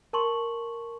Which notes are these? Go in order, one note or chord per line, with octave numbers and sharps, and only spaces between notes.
A#4 A5 C6 C#6 F#7